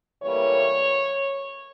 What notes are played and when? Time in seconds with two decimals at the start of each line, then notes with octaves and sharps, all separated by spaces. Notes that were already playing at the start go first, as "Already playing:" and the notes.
0.23 A2 E3 G3 A#3 C#5